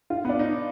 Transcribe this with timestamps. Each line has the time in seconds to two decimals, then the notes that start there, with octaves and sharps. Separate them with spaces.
0.10 F4
0.25 B3
0.29 D4
0.39 D#4